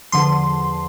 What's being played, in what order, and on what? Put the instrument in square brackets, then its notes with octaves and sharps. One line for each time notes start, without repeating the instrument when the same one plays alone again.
[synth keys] E2 D3 F3 C6